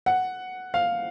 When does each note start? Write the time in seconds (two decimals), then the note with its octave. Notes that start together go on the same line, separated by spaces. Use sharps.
0.06 F#5
0.74 F5